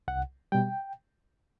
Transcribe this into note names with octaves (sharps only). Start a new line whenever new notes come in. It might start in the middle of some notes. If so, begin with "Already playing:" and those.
C2 F#5
B2 G3 G5